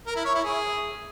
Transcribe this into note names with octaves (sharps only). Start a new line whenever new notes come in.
A#4
E4
C#5
E4
G#4